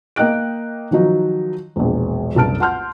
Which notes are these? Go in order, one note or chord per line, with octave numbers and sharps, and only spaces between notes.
A#3 D#5 G5 F#6 D7
D#3 F3 F#3 D#4
E1 A#1
F#1 C2 G2 A5 F6 D7
F#5 A5 C6 F6 G6